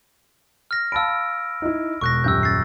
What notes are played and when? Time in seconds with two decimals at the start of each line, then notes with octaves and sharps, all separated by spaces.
0.71 F6 A#6
0.92 F5 A5 B5 E6 D7
1.62 D#4 E4
2.01 E1 C#6 F#6 A#6
2.24 D#1 F#2 G4 E6 G6
2.43 A6 C7